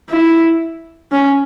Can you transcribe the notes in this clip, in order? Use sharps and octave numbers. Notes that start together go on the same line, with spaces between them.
E4
C#4